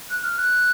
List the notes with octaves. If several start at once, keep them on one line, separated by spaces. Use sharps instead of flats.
F#6
F6
F#6